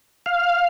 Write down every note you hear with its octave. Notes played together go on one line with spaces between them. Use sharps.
F5